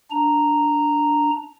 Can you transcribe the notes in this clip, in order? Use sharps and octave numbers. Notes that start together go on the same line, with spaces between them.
D4 A#5